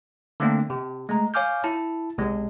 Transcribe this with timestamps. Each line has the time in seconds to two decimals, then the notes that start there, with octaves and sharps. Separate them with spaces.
0.40 D3 A3 A#3 C4 D4
0.70 C3
1.09 G#3 A3 A#5
1.34 C#5 F5 G#5 D6 F6 G6
1.64 E4 A5
2.18 B1 C3 G#3